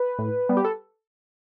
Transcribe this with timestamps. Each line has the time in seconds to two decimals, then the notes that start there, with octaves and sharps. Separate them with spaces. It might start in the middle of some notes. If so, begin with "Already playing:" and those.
Already playing: B4
0.19 A2
0.49 G3 B3
0.57 G4
0.65 A4